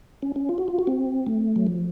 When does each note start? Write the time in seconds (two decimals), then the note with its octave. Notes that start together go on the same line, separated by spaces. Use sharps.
0.22 C#4
0.36 C#4
0.49 F4
0.58 F#4
0.68 F4
0.79 F#4
0.87 C4
1.27 A3
1.56 F#3
1.67 F3